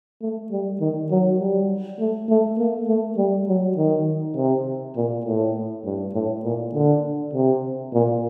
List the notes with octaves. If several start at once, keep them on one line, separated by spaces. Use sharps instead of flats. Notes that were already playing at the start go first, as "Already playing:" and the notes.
A3
G3
D#3
F#3
G3
A3
A3
A#3
A3
G3
F#3
D#3
C3
A#2
A2
G2
A2
A#2
D3
C3
A#2